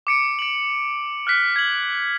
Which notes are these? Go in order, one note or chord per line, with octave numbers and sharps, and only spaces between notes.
D6 C#7 D7
D7 F#7
F6 F#6 B6
G#6 F#7